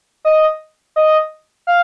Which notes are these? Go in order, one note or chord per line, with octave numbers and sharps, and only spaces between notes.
D#5
D#5
F5